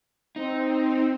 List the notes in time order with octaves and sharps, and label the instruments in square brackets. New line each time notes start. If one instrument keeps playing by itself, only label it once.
[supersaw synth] C4 [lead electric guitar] D#4